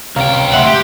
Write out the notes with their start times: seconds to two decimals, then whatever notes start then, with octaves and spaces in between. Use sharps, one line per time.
0.16 C#2 C3 F5 G5 A#5
0.54 A3 E5 F#5 C6
0.67 G4